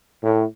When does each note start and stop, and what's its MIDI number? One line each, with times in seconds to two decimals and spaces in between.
0.24 0.45 45